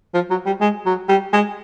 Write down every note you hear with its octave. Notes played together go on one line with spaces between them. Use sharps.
F3
F#3
G3
G#3
F#3
G3
G#3